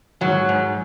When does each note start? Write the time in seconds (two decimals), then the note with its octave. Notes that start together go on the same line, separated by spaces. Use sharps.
0.21 G#2 F#3
0.49 G#2